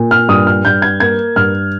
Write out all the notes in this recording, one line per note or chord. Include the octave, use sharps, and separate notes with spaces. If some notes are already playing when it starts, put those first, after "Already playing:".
Already playing: A#2
F6
G2 D#6
F6
G2 G6
G#6
A#3 G#6
G2 F6